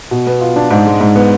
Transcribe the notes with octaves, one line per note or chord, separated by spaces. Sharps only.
B2
B3
F4
D4
G#2
G#3
G#2
B3